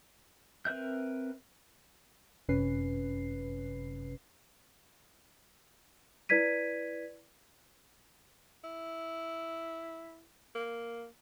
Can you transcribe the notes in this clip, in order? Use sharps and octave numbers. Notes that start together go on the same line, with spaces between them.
C4 A#4 B4 E5 G6
G1 F#2 C3 C#4 B4 C7
E4 B4 D5 G#6 B6 D#7
E4
A#3